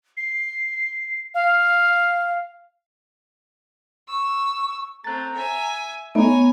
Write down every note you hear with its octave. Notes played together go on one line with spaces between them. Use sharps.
C7
F5
C#6 E6
A3 C4 A#5 F#6 A6
E5 G#5
A3 B3 D#4 C#5 G#5 A#5